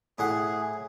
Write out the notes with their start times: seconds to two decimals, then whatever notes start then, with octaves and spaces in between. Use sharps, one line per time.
0.18 A2 G#4 F#5